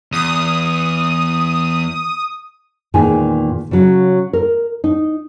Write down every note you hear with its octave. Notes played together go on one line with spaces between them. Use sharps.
E2 D#6
E2 A#2 D#3 G#3 G#5
C#3 F#3
A#4
D#4